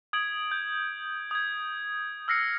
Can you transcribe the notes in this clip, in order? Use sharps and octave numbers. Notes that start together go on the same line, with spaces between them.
D#6 G#6 D7 F#7
G6
D#6 G#6
E6 F6 A#6 C7 C#7